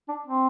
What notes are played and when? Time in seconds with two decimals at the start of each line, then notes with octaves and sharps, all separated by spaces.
0.08 D4
0.27 C4